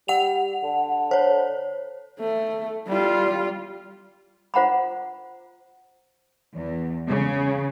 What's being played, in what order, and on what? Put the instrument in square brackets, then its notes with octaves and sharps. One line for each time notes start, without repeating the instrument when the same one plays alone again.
[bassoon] G3 [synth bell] F#5 F7
[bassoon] D3
[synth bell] C5 C#5
[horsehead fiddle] A3
G3 F4
[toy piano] F4 C5 F#5 A#5 B5
[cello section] E2
C#3